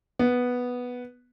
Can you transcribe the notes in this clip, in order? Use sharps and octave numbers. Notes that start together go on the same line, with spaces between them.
B3